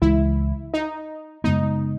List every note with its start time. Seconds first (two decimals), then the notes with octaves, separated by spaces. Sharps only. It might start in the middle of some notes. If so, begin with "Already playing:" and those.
0.02 C#2 C#3 E3 G#3 E4
0.74 D#4
1.44 F#2 C#3 G#3 B3 D#4